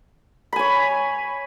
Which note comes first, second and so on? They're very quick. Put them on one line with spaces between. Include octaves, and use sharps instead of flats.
B5 G#5 C#5